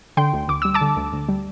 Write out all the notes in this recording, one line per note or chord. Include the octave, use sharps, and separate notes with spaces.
D3 G5 C6
D2
D2 D6
G3 E6
A5 D6
D3
D2
D2
G3